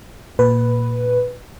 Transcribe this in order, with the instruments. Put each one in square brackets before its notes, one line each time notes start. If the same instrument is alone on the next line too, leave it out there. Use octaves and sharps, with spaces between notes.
[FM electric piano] A#2 B4